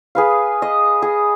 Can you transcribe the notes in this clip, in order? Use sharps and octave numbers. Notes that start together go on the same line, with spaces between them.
G#4 B4 F5
D#5
G#4